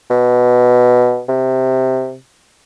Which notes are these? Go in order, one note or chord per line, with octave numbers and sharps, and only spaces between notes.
B2
C3